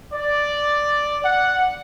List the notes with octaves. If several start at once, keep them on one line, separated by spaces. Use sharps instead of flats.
D5
F#5